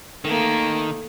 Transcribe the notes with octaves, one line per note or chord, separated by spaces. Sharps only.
D#3 A3 A#3